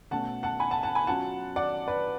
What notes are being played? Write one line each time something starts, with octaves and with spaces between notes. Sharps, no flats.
B2 A3 C#4 F#5 A5
F#5 A5
G#5 B5
F#5 A5
F#5 A5
G#5 B5
F#3 C#4 F4 F#5 A5
D5 F#5
B4 D5